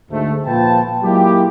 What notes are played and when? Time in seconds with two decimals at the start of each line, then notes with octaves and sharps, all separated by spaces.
0.11 D2 G#2 A3
0.46 A#2 F3 F4 B4 G5 A5
1.03 F#3 G#3 A#3 E4 F4 G4